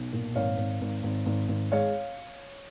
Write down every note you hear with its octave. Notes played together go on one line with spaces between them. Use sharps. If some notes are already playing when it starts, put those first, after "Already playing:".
Already playing: B1
A#2
G#1 C#5 F5
G#1
G#1
G#1
G#1
G#1
G#3 C#5 F5